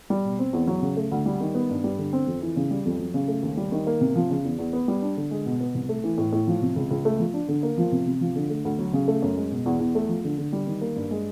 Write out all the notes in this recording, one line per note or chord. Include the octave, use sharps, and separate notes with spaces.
G3
B2
C4
E2
F#3
C#3
A3
D2
G3
D#3
B3
G2
G3
D3
C4
F2
E3
C#3
G3
F2
F#3
C#3
A3
D#2
G3
D#3
A#3
C3
F3
C#3
E2
E2
B3
G3
D4
D3
G#3
B2
B3
C2
A3
E3
A2
A2
F3
C3
C#2
C#2
A3
F3
D4
D3
A#3
F3
C3
C3
F3
D3
A3
D2
F#3
C#3
A3
F#2
G#3
B2
E2
E2
A3
F3
D3
D3
G3
D#3
A#3
G2
G#3